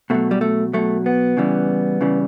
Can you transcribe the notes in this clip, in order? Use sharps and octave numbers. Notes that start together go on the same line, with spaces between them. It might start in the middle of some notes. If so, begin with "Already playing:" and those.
B2 F#3 A3
G3
A3
B2 F#3 A3
B3
C#3 E3 G3
C#3 E3 G3